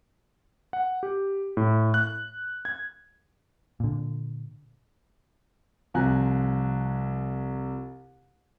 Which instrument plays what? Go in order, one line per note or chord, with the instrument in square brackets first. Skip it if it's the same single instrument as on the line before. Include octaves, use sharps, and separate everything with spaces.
[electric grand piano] F#5
G4
A2
F#6
G#6
[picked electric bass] A#2 D3
[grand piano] C2 F3 G#5 A#5 F#6